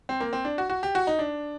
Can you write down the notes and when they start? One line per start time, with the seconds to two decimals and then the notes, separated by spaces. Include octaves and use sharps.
0.09 C4
0.20 A#3
0.33 C4
0.45 D4
0.58 F#4
0.70 F#4
0.83 G4
0.95 F#4
1.07 D#4
1.19 D4